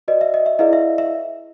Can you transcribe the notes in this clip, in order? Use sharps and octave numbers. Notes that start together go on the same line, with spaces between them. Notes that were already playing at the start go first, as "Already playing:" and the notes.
F#4 B4 D5 D#5
E5
D#5
E5
E4 G#4 B4 D5 D#5 F5
E5
E5